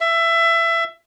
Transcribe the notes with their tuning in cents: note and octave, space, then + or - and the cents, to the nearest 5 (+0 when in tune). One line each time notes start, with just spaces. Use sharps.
E5 +20